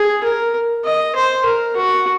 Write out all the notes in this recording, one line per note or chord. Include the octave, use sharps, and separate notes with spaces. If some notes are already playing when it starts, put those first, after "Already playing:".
Already playing: G#4
A#4
D#5
C5
A#4
F#4